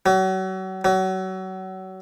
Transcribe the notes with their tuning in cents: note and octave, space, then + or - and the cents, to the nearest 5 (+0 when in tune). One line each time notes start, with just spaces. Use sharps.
F#3 +35
F#3 +30